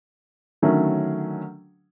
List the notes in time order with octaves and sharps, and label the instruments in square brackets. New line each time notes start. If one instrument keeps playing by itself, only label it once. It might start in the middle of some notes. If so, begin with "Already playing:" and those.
[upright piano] D3 D#3 F#3 A3 C#4